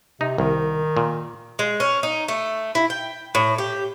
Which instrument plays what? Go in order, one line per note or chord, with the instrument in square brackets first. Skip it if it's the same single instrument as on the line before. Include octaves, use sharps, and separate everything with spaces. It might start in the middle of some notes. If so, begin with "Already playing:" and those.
[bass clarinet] C3 [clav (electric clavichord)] D#4
[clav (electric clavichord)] C2 [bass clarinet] D#3
[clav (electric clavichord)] A#2
[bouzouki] G#3
C#4
D#4
A3
E4
G5
A2
G4